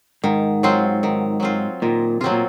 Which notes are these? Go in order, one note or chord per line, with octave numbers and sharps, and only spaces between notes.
G#2 D#3
F#3 C4 F4
D#3
F#3 C4 F4
A#2 D#3
C3 F#3 C4 F4
A#2